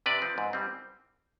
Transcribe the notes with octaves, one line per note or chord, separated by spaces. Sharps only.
C3 B4 D5
F3 C4
G#2
G3 C4